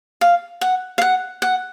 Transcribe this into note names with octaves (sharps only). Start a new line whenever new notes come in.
F5
F#5
F5
F#5
F#5